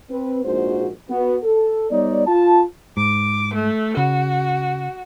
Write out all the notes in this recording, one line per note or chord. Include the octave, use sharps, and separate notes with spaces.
C4 B4
A#1 G#2 F#4 C5
B3 F#4
A4
G3 B3 D#4 C#5 D5
F4 A5
G#2 D6
A3
C#3 F#4